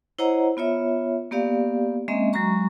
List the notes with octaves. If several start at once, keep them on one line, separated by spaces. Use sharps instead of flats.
E4 C5 C#5 D#5 F#5 A#5
B3 F4 C#5 E5
A#3 B3 G4 D5 F5
G#3 A#3 C4 C#4 D#5 E5
F#3 G#3 F#4 A#5 C#6